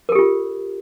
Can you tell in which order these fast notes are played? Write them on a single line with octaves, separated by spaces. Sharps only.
A#4 A4 G4 F4